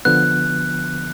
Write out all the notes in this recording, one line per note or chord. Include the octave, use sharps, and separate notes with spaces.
D3 F3 B3 F#6